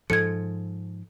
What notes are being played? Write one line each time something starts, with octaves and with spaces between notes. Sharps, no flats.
G#2 F3 A4 G#6 C#7